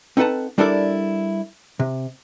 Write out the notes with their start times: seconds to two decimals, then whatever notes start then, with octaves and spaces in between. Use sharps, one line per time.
0.17 C4 D#4 A4 B4 F#5 A5
0.58 G3 D4 E4 A4 A#4 D5
1.79 C3